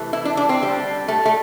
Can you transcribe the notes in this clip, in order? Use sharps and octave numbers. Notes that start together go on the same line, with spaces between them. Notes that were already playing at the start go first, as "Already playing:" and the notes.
Already playing: C3 E3 A3
E4
D4
D4
C4
D3 G3
A3
A3